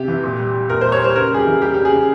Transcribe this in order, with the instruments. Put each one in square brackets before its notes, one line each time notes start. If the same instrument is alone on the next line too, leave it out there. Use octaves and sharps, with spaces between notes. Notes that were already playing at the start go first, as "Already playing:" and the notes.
Already playing: [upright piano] C3 G4
E3
A#2
G3
G3
A#2 A#4
C5
G3
C#5
G3 C5
C#3 A#4
G3 G#4
G4
E3
G3 G4
C#3 G4
G#4
C#3